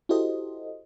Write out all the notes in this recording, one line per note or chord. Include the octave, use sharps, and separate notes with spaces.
E4 F#4 G4 A4 C5 D#5